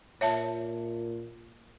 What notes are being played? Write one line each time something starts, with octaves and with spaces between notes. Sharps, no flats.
A#2 C#5 E5 A5